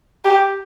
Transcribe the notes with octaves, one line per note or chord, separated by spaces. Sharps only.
G4